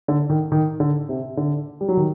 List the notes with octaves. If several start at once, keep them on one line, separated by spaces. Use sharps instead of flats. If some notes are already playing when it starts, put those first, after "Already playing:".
D3
D#3
D#3
D3
C3
D3
G3
F#3
D#3